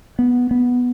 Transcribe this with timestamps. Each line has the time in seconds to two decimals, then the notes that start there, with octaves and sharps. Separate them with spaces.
0.19 B3
0.51 B3